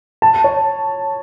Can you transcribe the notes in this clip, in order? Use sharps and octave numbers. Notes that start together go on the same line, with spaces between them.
A5
C#5